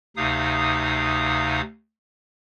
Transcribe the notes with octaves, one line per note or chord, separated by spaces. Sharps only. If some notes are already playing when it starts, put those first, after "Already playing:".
D2 C3 D#4 F5 D#6